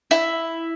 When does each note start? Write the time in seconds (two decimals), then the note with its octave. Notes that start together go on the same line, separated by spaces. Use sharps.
0.11 E4